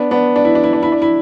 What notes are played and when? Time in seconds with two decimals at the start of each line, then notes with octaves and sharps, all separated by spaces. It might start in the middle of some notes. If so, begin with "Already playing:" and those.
Already playing: B3 D4
0.11 B3 D4
0.36 D4
0.45 E4
0.55 D4
0.63 E4
0.73 D4
0.83 E4
0.92 D4
1.02 E4